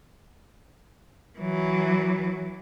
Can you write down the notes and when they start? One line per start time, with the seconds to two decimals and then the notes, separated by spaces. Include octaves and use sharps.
1.39 E3 F#3